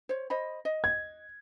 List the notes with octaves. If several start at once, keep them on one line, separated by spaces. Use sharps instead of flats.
C5 C#5
C5 D#5 B5
D#5
G#6